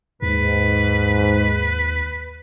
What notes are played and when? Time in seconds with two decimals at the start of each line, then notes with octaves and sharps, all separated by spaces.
0.22 D#2 G#2 B4